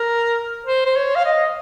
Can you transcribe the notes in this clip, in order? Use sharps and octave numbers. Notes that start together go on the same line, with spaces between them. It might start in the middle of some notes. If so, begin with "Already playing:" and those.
Already playing: A#4
C5
C5
C#5
F5
D#5